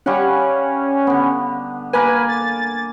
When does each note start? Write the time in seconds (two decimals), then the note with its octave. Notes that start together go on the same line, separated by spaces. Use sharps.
0.06 G3 C#4 F5 F#5
1.07 D3 B3
1.93 A#3 B4 G#5
2.29 A6